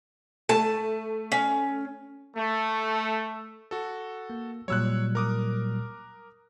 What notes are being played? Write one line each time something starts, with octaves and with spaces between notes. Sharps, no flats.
A3 A5
C#4
A3
F#4 A4
A#3
A#2 F#3 G3 C#5 E6 F#6
A#4 D6 D#6